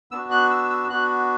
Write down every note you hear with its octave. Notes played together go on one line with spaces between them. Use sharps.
B3 D4 F#4 E6
F#6
E6
E6
B3 D4 F#4 F#6